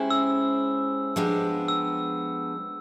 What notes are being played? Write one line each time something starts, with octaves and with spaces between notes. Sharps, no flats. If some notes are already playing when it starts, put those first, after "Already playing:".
Already playing: G#3 C#4 E4 G4 C5
E6
F3 G#3 B3 D4 G4
E6